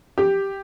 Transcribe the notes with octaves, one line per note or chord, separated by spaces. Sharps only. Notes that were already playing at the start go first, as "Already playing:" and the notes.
G4